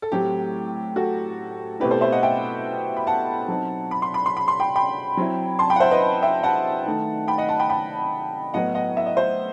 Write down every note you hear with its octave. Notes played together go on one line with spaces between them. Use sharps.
A4
A2 F#3 A3 C4 G4
F#4 A4
B2 A3 C4 E4 G4 B4
A4 C5
C5 E5
D#5 F#5
E5 G5
B5
F#5 A5
F#3 C4 D#4
B5
C6
B5
C6
B5
C6
G5 B5
G5 B5
F#3 C4 E4
A5 C6
G5 B5
F#5
C5 E5
B4 D#5
E5 G5
F#5 A5
D#3 A3 D#4
G5 B5
D#5 F#5
F#5 A5
G5 B5
G5 B5
A2 F#3 B3 D#5 F#5
D#5 F#5
E5
D#5
C5 E5